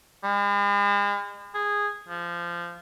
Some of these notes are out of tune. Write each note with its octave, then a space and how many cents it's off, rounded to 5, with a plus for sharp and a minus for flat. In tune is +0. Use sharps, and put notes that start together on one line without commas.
G#3 -45
G#4 -10
F3 -20